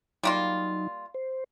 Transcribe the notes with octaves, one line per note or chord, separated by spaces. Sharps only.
F#3 G3 A#3 D#4 F4
C5